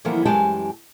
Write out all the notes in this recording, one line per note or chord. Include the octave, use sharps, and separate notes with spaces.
D3 E3 F3 G3 A#3 B3
F#2 E3 G#3 G4 G#5 A5